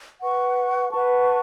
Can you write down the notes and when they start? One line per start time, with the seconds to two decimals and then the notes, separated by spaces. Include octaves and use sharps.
0.20 B4 F#5 C#6
0.90 B4 F#5 A5 C#6